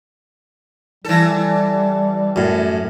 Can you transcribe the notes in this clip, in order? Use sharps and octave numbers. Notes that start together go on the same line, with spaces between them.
E3 G3 A4
F#2 A2